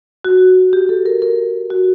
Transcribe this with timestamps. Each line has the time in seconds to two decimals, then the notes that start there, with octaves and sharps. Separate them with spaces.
0.25 F#4
0.73 G4
0.89 A4
1.06 A#4
1.22 A#4
1.70 F#4